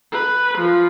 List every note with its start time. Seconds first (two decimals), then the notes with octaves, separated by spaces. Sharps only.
0.12 B4
0.58 F3